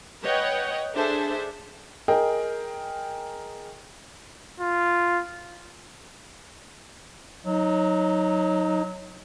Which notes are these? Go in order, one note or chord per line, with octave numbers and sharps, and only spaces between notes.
B4 C#5 D#5 F#5 G5
D4 G#4 A4 C5 E5
G#4 A#4 D#5 G5
F4
F#3 D#4